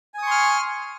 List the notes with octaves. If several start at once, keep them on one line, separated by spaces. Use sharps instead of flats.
G#5 C6 C#6 D#6 F6